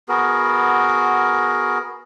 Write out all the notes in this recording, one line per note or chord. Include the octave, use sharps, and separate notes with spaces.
B3 F#4 G#4 A#4